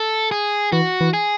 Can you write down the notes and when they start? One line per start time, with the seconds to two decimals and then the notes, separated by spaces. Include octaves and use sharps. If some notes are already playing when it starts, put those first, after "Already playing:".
Already playing: A4
0.32 G#4
0.72 E3 F#4
1.01 E3
1.14 G#4